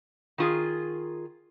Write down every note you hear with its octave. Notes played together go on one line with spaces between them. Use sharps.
D#3 F4 G#4